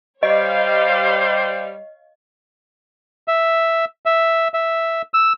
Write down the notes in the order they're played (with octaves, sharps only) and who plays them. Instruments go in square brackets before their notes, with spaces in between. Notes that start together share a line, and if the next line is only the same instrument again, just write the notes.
[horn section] G3 [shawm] C5 [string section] C#5 F5 [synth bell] D#5
[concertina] E5
E5
E5
E6